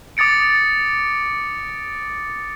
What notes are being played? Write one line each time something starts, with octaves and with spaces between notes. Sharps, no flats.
D6 D#6 A6 C#7 D7